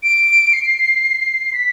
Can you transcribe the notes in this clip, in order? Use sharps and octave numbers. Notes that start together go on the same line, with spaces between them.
D7
C7
B6